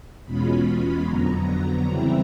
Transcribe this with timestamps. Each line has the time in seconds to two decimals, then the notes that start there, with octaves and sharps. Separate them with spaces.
0.25 E2 B2 G#3 C#4 F4 B5
1.07 F2 D3 F#3 B3 A#5
1.47 A#5
1.88 C#3 E3 G3 C4 E4